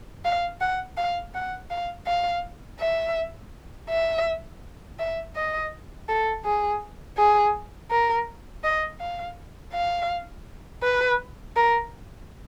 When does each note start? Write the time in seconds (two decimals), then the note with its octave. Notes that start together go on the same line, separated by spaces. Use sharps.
0.25 F5
0.61 F#5
0.97 F5
1.35 F#5
1.70 F5
2.07 F5
2.80 E5
3.89 E5
4.99 E5
5.36 D#5
6.09 A4
6.45 G#4
7.18 G#4
7.91 A#4
8.64 D#5
9.00 F5
9.74 F5
10.83 B4
11.56 A#4